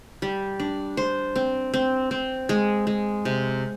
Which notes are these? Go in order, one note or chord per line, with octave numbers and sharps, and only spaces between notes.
G3
D4
C5
C4
C4
C4
G#3
G#3
C3